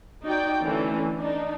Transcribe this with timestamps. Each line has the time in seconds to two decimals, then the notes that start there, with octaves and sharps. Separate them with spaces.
0.23 D#4 F#4 D5 G5
0.63 D3 E3 A3 C#4
1.17 D4 D#4